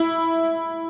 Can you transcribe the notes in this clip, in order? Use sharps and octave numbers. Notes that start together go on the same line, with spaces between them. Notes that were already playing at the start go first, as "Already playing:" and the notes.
Already playing: E4